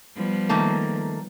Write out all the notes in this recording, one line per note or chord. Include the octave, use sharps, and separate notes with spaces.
F3 G3 B3
D#3 A3 A#3